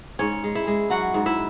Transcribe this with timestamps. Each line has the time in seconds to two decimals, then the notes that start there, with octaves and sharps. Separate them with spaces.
0.19 G#2 C#4 C#5
0.44 G#3
0.55 E4 E5
0.67 G#3
0.90 F#3 F#4 F#5
1.14 G#2
1.26 E4 E5